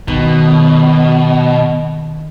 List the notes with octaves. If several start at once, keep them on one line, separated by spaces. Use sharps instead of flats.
B2 D#3